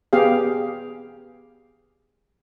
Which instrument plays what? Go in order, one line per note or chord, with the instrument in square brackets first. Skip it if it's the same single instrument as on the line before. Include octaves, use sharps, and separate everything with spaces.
[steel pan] B3 G4 G#4 F5